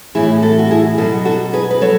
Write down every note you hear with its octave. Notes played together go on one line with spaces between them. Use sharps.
A2 E3 E4 G#4
F#4 A4
F#4
E4 G#4
B2 F#3 F#4 A4
F#4 A4
G#4 B4
B4
F#3 A4 C#5